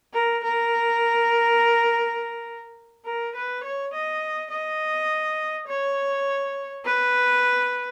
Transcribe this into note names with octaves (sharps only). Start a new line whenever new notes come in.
A#4
A#4
A#4
B4
C#5
D#5
D#5
C#5
B4